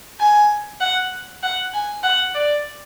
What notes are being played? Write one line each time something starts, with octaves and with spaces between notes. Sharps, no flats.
G#5
F#5
F#5
G#5
F#5
D5